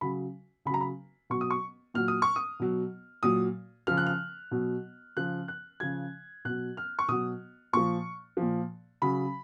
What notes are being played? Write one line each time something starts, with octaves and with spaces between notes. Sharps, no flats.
C#3 F#3 B5
C#3 F#3 A#5 B5
B5
B2 F#3 C#6
D#6
C#6
A#2 F#3 F6
D#6
C#6
D#6
B2 F#3
A#2 F#3 D#6
C#3 F3 F6
F#6
F6
B2 F#3
C#3 F3 F#6
F#6
C#3 F3 G#6
B2 F#3 F#6
F6
C#6
B2 F#3 D#6
A#2 F3 C#6
A#2 F3
C#3 F#3 B5